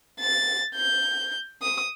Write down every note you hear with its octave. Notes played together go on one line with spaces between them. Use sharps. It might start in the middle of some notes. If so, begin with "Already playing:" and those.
A6
G6
D#6